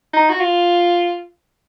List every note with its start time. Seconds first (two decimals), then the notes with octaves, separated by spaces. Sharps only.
0.13 D#4
0.30 F#4
0.40 F4